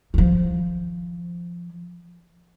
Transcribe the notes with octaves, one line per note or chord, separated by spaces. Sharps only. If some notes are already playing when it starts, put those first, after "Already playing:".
D#3 F3